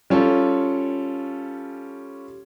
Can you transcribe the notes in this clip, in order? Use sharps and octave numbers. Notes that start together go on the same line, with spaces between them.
G3 C#4 F4 A4